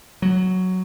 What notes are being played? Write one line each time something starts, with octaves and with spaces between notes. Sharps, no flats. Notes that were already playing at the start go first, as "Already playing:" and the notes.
F#3